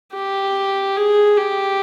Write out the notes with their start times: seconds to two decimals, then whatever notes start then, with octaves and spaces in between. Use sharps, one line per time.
0.14 G4
0.97 G#4
1.37 G4